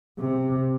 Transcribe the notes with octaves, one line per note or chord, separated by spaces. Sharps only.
C3